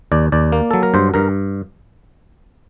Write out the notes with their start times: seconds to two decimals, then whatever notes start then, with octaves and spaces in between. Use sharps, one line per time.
0.12 D#2 D5
0.32 D#2 D5
0.52 A#3
0.71 F#3 A4
0.83 A#4
0.94 G2 C5
1.14 G2 A#4